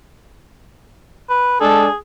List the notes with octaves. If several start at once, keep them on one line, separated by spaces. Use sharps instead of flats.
B4
G#3 D4 G#4 A4